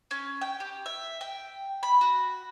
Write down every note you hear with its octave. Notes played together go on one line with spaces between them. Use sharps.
C#4
G5
G4
E5
G5
B5
F#4